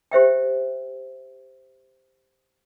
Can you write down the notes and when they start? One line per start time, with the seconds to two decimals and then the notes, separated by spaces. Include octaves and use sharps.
0.11 G4 C5 E5 G5